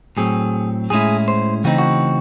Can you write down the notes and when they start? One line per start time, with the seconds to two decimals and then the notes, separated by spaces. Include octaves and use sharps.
0.17 A2 F#3 C4 G#4
0.90 A2 G#3 C#4 E4 G#4
1.28 C5
1.64 C#3 E3 A3 C4 D#4 F#4
1.78 F#4